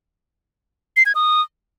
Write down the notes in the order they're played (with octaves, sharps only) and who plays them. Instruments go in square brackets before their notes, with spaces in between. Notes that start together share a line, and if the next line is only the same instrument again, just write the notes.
[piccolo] C7
G#6
D#6